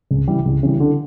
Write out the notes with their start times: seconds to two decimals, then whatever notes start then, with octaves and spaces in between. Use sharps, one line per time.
0.11 C#2
0.27 C#3 E3 G3
0.46 C#2
0.63 C#3 E3 G3
0.80 D3